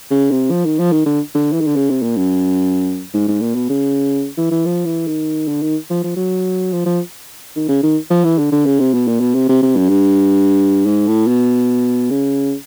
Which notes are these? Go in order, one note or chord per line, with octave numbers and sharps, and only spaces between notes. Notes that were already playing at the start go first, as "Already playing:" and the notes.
C#3
C3
F3
D#3
F3
D#3
D3
D3
E3
D#3
D3
C#3
C3
A#2
F#2
G#2
G#2
A#2
B2
C#3
E3
E3
F3
E3
D#3
D3
D#3
F3
F3
F#3
F3
F3
D#3
C#3
D#3
F3
E3
D3
D3
C#3
C3
B2
A#2
B2
C3
C3
C3
F#2
G2
G#2
A2
B2
C#3